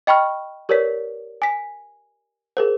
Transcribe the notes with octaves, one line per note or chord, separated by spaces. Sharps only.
D#5 G5 B5 C#6 F6
G4 A#4 B4 C#5 D5 B6
G#5 B6
G#4 A#4 C5